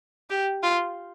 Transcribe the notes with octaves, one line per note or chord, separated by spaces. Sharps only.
G4
F4